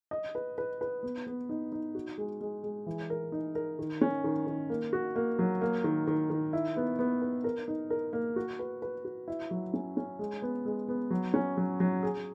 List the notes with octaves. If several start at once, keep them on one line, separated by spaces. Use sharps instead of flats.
D#5
B4
B4
B4
B3
B3
D#4
D#4
F#4
G#3
G#3
G#3
E3
A#4
D#4
A#4
D#3
C#4
D#3
D#3
A#3
F#4
A#3
F#3
A#3
D#3
D#3
D#3
E4
B3
B3
B4
A#4
D#4
A#4
A#3
F#4
B4
B4
F#4
E4
F#3
C#4
C#4
G#3
B3
G#3
B3
F#3
C#4
F#3
F#3
G#4